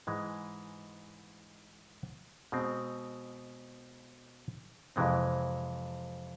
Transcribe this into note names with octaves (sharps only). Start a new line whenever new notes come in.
G#2 E3 G#3
B2 G#3 C4
F2 C3 E3 G#3 C4